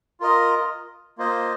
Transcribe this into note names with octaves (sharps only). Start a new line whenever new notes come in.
F4 A#4 D#5
A#3 F4 C5 D#5